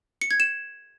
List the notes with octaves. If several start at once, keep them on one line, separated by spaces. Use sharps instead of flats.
C#7
G#6
E7